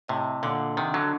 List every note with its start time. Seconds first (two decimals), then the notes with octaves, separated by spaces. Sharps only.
0.08 A2 C3 D#5
0.43 A#2 D3 F#5
0.77 C3 D#3 D4
0.94 D3 F#3